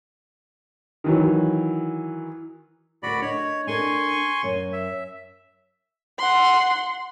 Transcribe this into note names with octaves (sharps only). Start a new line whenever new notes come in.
D#3 E3 F#3
D2 F#4 A#4 D5 B5
D4 C#5 D#5
D4 A4 A#4 G#5 C6 C#6
F#2 A#4 C#5
E5
F#5 C6